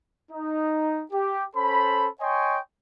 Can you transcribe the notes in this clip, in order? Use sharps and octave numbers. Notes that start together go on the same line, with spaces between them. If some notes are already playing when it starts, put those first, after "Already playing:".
D#4
G4
C#4 A4 C5 B5
C#5 D#5 G5 G#5 C6 C#6